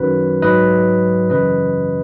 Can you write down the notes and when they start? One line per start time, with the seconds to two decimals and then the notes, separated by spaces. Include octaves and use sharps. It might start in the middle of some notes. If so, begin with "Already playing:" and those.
Already playing: F#2 D#3 F#3 B4
0.42 G#2 F#3 B4 D#5
1.30 F#2 C#3 E3 B4 D#5